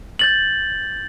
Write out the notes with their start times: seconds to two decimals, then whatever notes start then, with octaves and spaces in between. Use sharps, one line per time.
0.19 G6 A6 F#7